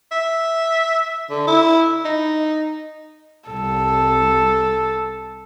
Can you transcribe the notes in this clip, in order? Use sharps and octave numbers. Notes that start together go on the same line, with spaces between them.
E5
D3
E4
D#4
C2 A4